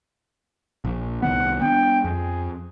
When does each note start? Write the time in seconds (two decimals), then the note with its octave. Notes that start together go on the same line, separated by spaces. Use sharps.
0.85 A#1
1.22 C2 D#3 B3 F#5
1.62 B3 D4 G5
2.04 F2 G#4